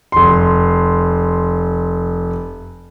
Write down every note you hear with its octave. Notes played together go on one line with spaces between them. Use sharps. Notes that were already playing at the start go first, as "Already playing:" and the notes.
F1 C6